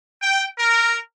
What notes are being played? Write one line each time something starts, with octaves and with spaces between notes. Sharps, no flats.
G5
A#4